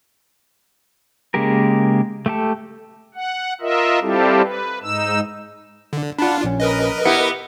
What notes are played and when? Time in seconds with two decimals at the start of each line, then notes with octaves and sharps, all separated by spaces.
1.34 C#3 G#3 A#3 G4 A#4
2.26 A3 G4 A4
3.15 F#5
3.61 F4 A#4 D#5 E5
4.02 G3 C4 E4 F4 G4 A4
4.42 B4
4.83 G#2 D#4 E6
5.93 D3
6.19 D4 F4 F#5 A5 B5
6.44 A#1 C#4
6.60 A#4 B4 D#5
7.05 B3 E4 G4 C#7